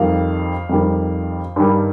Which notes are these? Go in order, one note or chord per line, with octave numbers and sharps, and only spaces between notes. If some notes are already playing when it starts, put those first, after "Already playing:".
Already playing: F2 D#3 G3 F5
F2 D#3 G3
G2 D#3 G3